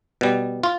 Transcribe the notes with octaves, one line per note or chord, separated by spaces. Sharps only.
B2 G3
F4